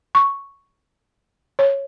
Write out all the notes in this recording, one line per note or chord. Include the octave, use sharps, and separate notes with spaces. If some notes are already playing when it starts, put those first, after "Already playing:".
C#6
C#5